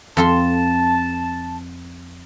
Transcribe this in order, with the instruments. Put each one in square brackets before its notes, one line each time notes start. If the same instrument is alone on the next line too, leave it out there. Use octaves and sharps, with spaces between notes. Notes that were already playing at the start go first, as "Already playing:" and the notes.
[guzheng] F2 A4 C6 [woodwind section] A5